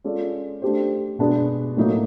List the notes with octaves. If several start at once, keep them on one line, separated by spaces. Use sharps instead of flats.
G#3 C#4 F4 A4 D5
A3 D4 G4 C5
B2 G#3 B3 D4
A2 F#3 A#3 D#4 F#4